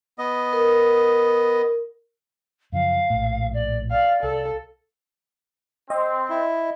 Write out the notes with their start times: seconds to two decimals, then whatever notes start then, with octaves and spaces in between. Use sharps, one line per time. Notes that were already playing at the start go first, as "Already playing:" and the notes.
0.18 B3 D#5
0.53 A#4
2.72 F#2 C#3 F3 F5
3.10 A#1 A2
3.53 D5
3.91 D5 F5
4.23 C2 A4
5.90 C4 D#5
6.30 E4